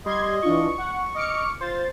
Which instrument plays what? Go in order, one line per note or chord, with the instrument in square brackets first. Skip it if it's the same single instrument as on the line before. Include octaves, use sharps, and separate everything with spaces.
[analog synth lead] G3 [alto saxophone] D#5 [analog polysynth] C6 G#6
[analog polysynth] E3 D4 F4 [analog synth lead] C#6
[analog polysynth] F#5
[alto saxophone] D#5 [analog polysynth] D6 F6 C#7
[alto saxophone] F4 [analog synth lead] C5 [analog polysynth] A6